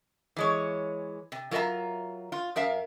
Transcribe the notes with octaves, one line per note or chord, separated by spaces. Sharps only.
E3 G#3 C#5
C3
F#3 F4 A#4 C#5 E5 A#5
F4
F#2 A#4 E5 F5